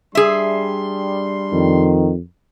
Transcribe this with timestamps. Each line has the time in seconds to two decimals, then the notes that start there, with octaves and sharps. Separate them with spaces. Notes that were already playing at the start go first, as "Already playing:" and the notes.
0.15 G3 D4 G#4 E5 C6
1.53 F2 D#3